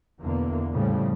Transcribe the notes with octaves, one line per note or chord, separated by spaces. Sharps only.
E2 B2 D3 A#3
F2 A2 C#3 F3 G3